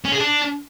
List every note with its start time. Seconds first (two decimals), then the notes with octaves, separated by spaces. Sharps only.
0.05 C#4
0.12 G#4
0.20 D4